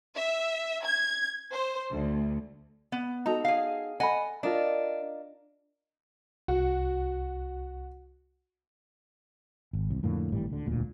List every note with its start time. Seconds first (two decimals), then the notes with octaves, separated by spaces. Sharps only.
0.17 E5
0.84 G#6
1.53 C5
1.92 D2
2.92 B3
3.26 D#4 F#4 A4 A#5
3.45 G#4 F5
4.00 A4 D#5 F#5 G#5 B5
4.43 D4 F4 A#4 D#5
6.48 C2 F#4
9.73 G#1
9.90 C2
10.03 F2 A2 D3 A#3
10.32 G#1 A2 E3 G3
10.49 D2 D3
10.66 E1 D2 A#2